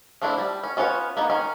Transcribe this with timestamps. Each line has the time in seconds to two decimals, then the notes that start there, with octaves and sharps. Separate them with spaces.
0.22 F3 A3 C4 D4 E4
0.38 G3
0.64 C#4
0.77 B3 C#4 F4 C5 C#5
1.17 A#3 B3 D#4
1.30 D#3 C#4